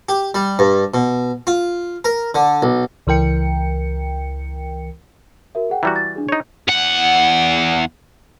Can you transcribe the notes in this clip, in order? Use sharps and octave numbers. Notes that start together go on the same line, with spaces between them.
G4
G3
G2
B2
F4
A#4
D3
B1
C#2 E3 A#4 G5 C#7
F#4 A#4 E5
G#4 F#5 G5
E3 G3 F#4 A#5
A6
D4 G#4
D#4 C#5
E2 F#5